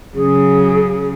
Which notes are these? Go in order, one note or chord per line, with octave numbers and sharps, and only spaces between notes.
C#3 F#3 G#4